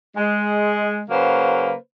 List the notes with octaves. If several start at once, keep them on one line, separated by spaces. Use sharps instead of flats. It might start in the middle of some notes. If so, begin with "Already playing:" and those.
G#3
C#3 F#3 A#3 B4 C5